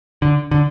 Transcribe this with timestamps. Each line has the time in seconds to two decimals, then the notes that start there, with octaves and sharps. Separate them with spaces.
0.22 D3
0.51 D3